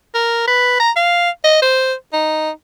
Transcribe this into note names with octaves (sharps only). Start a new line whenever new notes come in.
A#4
B4
A#5
F5
D#5
C5
D#4